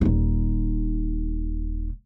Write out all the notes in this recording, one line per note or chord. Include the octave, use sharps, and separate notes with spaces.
D#1 D#4